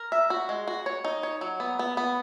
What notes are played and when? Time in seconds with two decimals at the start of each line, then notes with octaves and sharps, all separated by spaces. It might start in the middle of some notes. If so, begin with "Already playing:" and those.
Already playing: A#4
0.12 E5
0.30 F#4
0.49 G#3
0.68 F#4
0.86 C#5
1.05 D#4
1.23 C#5
1.41 F#3
1.60 B3
1.79 B3
1.97 B3